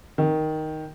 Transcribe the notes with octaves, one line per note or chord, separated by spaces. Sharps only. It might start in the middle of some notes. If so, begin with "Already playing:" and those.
D#3